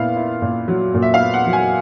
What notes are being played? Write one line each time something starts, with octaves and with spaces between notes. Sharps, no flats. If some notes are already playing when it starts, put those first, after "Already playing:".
Already playing: A#2 B3 E4 F5
E4
A#2
F#3
A#2
E5
F5
B3
F#5
F#3
G#5